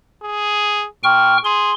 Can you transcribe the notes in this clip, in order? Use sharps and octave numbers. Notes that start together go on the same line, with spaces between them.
G#4
A#2 G5 C#6 F6
G#4 C6